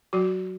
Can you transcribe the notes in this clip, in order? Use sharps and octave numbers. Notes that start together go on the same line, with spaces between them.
F#3 F#4